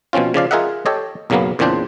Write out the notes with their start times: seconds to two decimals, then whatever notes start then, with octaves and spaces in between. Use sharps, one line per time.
0.13 B2 F3 C4 C#4 F4
0.34 C#3 F3 D5 F5
0.51 F4 G#4 A#4 D#5 E5 F#5
0.86 G4 A4 C#5 D#5
1.30 B1 F#2 C#3 F#3 A#3 B3
1.59 E2 A#2 C#3 C4 D4 C5